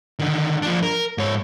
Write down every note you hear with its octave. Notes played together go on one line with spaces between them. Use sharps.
D3 D#3
F3 D4
A#4
G#2 C#5